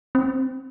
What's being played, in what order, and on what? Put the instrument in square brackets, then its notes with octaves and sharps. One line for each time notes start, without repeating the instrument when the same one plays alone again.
[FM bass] C4